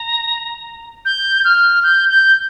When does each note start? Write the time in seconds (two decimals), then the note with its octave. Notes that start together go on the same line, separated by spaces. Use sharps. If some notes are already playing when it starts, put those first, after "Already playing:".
Already playing: A#5
1.05 G6
1.45 F6
1.83 G6
2.09 G6